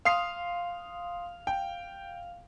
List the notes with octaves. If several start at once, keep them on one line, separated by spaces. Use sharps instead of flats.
F5 C6 D#6 C7
G5